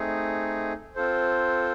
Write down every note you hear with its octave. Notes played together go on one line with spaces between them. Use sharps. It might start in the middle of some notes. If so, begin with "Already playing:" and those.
Already playing: A3 C4 D#4 G#4
C4 F4 A4 C5